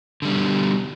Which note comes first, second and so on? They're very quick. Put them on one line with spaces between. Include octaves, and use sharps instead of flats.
D3 G3 B2